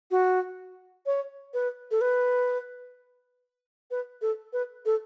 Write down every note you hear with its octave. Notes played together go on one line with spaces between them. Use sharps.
F#4
C#5
B4
A4
B4
B4
A4
B4
A4